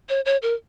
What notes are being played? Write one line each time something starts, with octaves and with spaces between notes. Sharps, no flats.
C#5
C#5
A#4